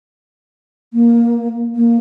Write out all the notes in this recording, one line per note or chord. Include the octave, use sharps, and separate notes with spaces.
A#3
A#3